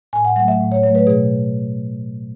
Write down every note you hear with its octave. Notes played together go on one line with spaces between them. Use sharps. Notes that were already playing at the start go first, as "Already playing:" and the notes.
A2 G#5
F#5
F#3 A3 F#5
E5
A2
C#5
F#3 A3 C#5
B4
B2 G#4